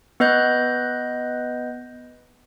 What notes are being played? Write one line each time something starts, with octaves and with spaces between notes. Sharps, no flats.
B3 B4 D#5 F#6 G6